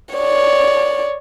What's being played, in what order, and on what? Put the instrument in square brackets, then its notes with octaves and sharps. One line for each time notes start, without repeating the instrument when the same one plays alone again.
[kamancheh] C#5 D5